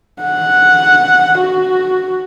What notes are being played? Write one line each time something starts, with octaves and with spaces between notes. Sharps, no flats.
F#5
F#4